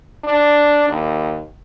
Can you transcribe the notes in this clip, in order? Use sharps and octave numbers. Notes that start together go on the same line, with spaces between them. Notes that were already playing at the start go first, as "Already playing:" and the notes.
D4
D#2